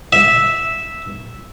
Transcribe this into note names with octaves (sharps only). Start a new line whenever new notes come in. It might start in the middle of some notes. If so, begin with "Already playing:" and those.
E5